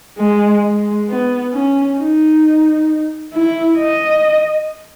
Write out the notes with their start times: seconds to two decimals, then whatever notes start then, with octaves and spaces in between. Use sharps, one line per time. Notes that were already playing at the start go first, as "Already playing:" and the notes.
0.18 G#3
0.63 G#3
1.08 B3
1.53 C#4
1.98 D#4
3.33 E4
3.78 D#5